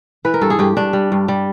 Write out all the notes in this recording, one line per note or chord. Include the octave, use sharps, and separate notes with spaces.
E3 B4
A#4
G2 A4
G#4
G2 G4
G2 D4
G3
G2
G3